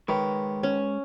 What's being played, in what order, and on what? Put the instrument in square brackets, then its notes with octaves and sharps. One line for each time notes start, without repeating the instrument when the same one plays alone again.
[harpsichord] D#3 [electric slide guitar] G#3 C#5 [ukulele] B4
[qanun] C#4